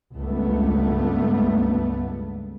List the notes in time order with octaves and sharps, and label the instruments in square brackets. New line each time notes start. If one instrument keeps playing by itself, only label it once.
[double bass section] C#2 G2 A3 B3